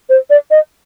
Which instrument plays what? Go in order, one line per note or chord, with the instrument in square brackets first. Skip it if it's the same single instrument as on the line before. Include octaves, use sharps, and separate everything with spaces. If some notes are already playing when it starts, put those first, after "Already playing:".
[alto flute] C5
D5
D#5